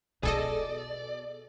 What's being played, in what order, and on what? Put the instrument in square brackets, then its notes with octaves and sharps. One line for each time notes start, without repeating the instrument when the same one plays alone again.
[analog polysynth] B2 [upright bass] D#4 F4 [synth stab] G#4 A4 D#5 [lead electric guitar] D5